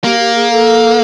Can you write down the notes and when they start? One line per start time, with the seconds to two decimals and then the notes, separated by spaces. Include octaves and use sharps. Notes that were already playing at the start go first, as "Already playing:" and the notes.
0.04 A#3 G4
0.19 G4
0.35 G#4
0.51 A4